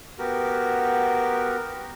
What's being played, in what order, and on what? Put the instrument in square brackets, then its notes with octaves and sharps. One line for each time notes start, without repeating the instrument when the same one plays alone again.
[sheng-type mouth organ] B3 F#4 G4 A#4